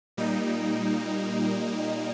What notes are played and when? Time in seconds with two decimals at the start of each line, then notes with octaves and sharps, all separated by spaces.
0.17 A#2 G3 A#3 D#4